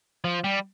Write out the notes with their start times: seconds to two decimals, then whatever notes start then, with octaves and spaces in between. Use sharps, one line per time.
0.24 F3
0.44 G3